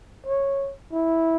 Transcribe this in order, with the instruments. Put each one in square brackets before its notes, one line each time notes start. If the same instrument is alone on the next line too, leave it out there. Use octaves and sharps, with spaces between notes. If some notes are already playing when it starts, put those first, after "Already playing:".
[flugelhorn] C#5
E4